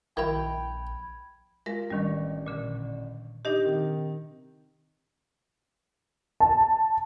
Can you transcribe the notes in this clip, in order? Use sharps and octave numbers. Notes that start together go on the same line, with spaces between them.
A#1 D#3 E4 G5 B5 G#6
G#3 F4 A#4 A#6
A1 D#3 G3 D4 C#6
A#2 D3
D4 D#4 G4 D#5
C3 D#3
A5